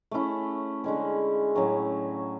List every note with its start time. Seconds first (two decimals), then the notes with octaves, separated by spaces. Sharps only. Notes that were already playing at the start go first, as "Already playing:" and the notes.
0.11 A3 C#4 E4
0.84 D3 G#3 C#4
1.55 A2 F#3 C#4